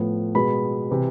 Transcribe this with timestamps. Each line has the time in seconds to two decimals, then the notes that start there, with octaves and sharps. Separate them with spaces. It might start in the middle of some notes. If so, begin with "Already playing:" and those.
Already playing: A2 F3 B3
0.35 B2 G#3 B3 B5
0.90 C3 E3